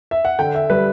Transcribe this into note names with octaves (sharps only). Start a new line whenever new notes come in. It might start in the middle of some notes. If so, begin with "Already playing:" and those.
E5
F#5
D3 G5
E5
G3 B4